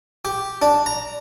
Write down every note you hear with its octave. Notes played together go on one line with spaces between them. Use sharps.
G4
D4
A#5